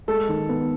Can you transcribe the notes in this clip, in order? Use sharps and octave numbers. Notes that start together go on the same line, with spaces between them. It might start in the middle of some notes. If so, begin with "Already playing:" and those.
G#3 A4
D#3
B3